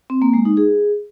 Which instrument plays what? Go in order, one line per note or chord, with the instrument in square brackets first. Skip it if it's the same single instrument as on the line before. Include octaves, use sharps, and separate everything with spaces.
[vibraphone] C4
A#3
G#3
D#4
G#4